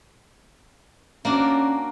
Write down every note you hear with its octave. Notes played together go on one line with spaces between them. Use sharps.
A#3 C#4 D4 F#4